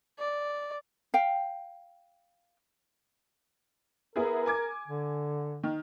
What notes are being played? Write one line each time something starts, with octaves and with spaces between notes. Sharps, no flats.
D5
F5 G5
B3 E4 G#4 A#4
G#5 D6 G#6
D3
D#3